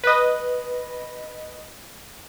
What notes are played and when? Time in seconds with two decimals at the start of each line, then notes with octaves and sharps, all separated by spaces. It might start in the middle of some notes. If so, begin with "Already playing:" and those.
0.04 B4 D#5